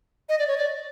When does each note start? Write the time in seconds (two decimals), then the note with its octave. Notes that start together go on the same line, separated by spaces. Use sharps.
0.29 D#5
0.39 D5
0.48 C#5
0.58 D5